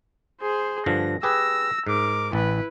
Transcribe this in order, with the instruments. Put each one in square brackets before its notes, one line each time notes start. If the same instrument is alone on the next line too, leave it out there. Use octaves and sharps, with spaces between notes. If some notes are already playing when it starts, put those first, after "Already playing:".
[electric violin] G#4 C5
[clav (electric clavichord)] G2 D3 F3 [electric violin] A#6
[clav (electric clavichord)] G4 G#4 B4 [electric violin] E6 A#6
[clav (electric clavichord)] G#2 [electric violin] A#4 D6
[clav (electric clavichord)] A1 [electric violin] E4 B4